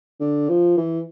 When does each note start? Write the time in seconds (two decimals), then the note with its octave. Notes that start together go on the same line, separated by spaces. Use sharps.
0.20 D3
0.49 F3
0.77 E3